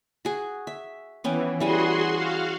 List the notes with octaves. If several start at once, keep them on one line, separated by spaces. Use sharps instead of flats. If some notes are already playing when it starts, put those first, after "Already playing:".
F#4 G#4
E5
E3 B3 C#4 G5
E3 G3 F#4 G#4 G#5 C6
F#4 F5